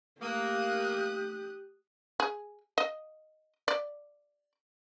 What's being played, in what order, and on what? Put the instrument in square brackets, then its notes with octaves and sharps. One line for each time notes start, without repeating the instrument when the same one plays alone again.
[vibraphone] A3 [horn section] A#3 [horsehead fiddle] G4 [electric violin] D#6 F#6
[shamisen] G#4
D#5
D5